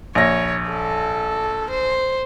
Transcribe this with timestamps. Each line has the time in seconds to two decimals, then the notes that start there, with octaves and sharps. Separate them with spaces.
0.15 A#1 C#5 A#6
0.70 A4
1.70 C5